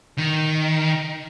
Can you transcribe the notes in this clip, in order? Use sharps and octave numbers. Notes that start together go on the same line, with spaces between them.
D#3